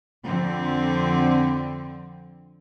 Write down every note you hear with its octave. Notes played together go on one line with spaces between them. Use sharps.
F2 D3 C4